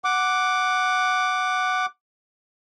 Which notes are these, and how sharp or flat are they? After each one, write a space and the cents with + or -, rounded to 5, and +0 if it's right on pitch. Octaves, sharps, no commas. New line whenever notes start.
F#5 +0 D6 +0